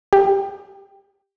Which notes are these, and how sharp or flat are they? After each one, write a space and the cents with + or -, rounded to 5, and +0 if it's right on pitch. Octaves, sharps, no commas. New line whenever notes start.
G4 +10